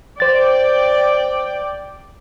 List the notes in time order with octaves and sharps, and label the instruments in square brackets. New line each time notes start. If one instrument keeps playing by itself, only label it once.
[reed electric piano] C5 A6 [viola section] D5 G5